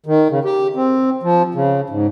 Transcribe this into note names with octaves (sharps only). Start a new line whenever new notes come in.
D#3
C#3
G4
C4
F3
C#3
G#2